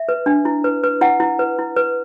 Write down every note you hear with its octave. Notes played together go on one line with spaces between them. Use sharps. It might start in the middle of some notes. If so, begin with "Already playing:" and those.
Already playing: E5
B4
D4
E4
B4
B4
E4 F#5
E4
B4
E4
B4